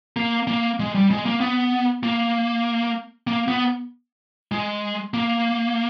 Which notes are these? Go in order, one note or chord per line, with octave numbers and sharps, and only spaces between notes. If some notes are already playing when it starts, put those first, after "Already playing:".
A#3
A#3
G#3
G3
G#3
A#3
B3
A#3
A#3
B3
G#3
A#3